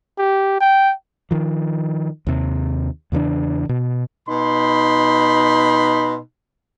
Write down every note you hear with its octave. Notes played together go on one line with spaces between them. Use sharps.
G4
G5
D#3 F3
D#2 C3
E2 C#3 E3 D4
B2
B2 D#4 B5 C6